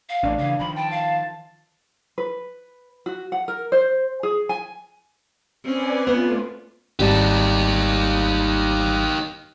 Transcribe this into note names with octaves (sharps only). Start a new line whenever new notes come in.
F5
A1 A3 D4
C#3 E3 F5
D#3 F3 B5
G5 A5
F5
B4
F#4
F#5
A#4
C5
G#4
G#5
C4 C#4 B4 D5 G#5
A3 B3 F4
G#1 G3 D#4 G4 A5